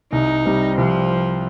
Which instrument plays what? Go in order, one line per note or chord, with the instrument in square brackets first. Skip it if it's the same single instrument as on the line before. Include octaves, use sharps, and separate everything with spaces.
[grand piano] C2 [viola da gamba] D#4
[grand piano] C3 G3
[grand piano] C2 [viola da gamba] F3